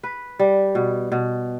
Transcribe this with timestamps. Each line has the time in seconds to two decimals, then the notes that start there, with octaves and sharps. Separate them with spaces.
0.03 B4
0.39 G3
0.75 B2
1.12 B2